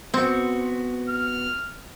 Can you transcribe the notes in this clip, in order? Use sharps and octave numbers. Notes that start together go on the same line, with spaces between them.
B3 C4 F#4
F6